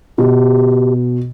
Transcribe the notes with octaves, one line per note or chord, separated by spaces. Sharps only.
B2 G4